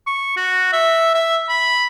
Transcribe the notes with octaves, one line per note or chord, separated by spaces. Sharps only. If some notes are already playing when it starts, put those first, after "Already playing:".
C#6
F#4
E5
E5
B5